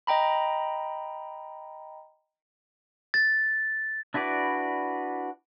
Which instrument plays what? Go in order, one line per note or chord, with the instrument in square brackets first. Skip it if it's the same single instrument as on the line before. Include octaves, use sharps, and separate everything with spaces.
[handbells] D#5 G5 A#5 B5
[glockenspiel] A6
[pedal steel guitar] D4 E4 F#4 B4 D5